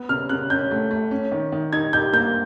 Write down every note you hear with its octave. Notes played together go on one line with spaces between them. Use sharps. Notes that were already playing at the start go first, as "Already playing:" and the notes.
Already playing: B3
C#3 F6
C#3 F#6
C#4 G6
A3
A3
C#4
D#3
D#3
D#4 G#6
G4 G6
A#3 G6